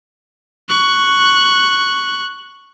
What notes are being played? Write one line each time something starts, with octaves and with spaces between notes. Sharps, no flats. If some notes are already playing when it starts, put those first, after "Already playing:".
C#6 F#6